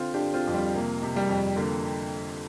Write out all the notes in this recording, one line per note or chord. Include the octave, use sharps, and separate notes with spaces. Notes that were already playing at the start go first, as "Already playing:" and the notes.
Already playing: D3 C4 F4
D4 G4
D3
C4 F4
F2
G3 C4
C3 A#3
C3
G3
F2
D3 A#3